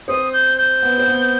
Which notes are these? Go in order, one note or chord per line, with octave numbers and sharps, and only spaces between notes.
C4 D#6
G6
G6
B3
C4
B3